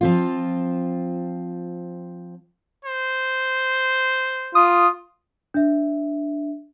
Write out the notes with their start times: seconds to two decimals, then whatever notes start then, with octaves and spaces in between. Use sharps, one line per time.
0.01 F3 C4 F4
2.85 C5
4.55 F4 D#6
5.54 D4 E5